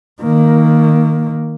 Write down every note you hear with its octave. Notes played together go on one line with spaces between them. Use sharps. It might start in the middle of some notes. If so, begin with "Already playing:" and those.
D#3 A#3